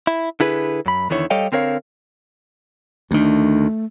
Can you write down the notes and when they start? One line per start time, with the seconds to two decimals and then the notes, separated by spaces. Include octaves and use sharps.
0.07 E4
0.40 D3 E4 G#4 B4
0.86 F#2 B5
1.10 E2 D3 D#3 E4 C#5
1.30 G3 A4 C#5 D#5 F5 G5
1.52 D3 C4 A#4 C#5 F5
3.11 D2 D#3 A3 D4